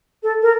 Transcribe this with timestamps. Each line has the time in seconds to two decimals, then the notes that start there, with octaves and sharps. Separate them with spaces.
0.23 A4
0.42 A#4